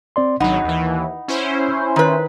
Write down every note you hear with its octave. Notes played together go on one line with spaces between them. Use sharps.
C4 D5 C6
G#1 F#3 D#4 F#5 B5
D#2 E3
C#4 E4 C5
D#3 B4